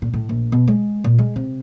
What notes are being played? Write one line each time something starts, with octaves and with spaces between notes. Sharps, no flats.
A#2
A2
A#1
B2
G#3
A#2
G#3
C3